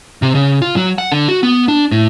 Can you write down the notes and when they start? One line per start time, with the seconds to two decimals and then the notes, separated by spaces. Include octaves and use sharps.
0.22 C3
0.35 C#3
0.62 F4
0.76 F#3
0.98 F#5
1.12 D3
1.28 F#4
1.43 B3
1.68 D4
1.91 A2